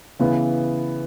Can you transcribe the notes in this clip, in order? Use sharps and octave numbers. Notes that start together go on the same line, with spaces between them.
C#3 E3 B3